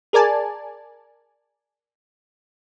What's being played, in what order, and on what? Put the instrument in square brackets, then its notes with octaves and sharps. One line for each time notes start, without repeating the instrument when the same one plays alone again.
[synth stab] G#4 A#4 D5 G#5 A5